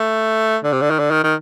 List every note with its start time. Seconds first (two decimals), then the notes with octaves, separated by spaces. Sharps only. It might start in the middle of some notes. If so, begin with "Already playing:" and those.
Already playing: A3
0.64 D3
0.73 C3
0.82 D3
0.90 D#3
0.99 D3
1.11 D#3
1.24 D#3